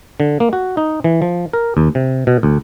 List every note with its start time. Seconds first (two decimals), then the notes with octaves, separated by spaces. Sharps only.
0.20 D3
0.40 A#3
0.53 F#4
0.77 D#4
1.04 E3
1.22 F3
1.53 A#4
1.77 D#2
1.95 C3
2.27 B2
2.43 D2